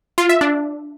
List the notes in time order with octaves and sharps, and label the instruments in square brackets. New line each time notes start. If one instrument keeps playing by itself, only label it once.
[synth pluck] F4
E5
D4